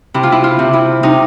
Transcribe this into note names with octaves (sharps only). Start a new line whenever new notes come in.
C3 E4
F4
E4
F4
C3
E4
C3 D#4